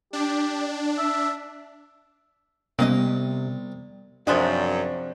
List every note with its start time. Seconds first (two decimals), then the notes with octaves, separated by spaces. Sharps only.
0.13 D4 G4
0.98 E5
2.79 C2 C3 A#3 B3 C#4 D#5 A5
4.27 F#2 C3 F3 D4 G#4